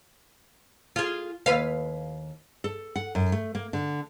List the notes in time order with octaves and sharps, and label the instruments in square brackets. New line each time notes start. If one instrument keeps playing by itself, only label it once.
[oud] F4 G#4
D#2 B4 F5
[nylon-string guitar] A4
F#5
F#2
A3
A#3
D3